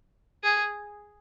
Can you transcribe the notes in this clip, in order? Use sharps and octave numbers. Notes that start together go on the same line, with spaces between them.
G#4